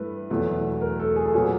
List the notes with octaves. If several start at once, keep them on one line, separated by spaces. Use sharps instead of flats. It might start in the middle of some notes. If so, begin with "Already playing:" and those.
Already playing: G2 E3 A3 A4 B4
E2 B2 F#3 A3
A#4
A4
G#4
A4
A#2 F#3 B3 G#4